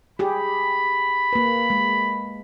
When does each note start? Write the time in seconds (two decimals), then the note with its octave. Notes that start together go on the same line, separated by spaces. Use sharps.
0.19 G4 G#4 B5
1.33 A#3 B4
1.70 G#3